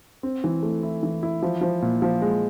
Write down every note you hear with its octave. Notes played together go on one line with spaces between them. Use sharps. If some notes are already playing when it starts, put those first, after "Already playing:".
C4
E3
A3
E4
E3
E4
F3
F3
A#2
F3
G#3